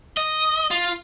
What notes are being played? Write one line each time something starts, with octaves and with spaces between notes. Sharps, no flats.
D#5
F4